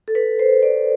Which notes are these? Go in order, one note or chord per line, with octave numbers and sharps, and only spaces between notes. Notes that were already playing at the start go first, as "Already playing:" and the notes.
A4
B4
C5
D5